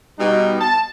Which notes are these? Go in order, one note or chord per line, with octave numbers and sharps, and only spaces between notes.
B2 G3 D#4
A5